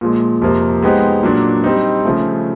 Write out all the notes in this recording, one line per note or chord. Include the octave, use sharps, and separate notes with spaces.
A#2 F3 G#3
F2 C3 F3 A#3
G#3 B3 D#4 G4 C5
A#2 F#3 A#3 D4
G3 C4 D#4
C#3 F3 A3